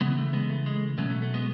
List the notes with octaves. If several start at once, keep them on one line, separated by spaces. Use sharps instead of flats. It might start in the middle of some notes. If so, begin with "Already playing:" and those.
C#3 E3 G#3 B3
A3
G#3 B3
A3
G#3
B2 F#3 A3 C#4
A3
A3
G#3 B3